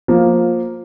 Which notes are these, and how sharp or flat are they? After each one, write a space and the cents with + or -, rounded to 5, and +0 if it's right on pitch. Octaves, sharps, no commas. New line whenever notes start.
F3 +15 A#3 +0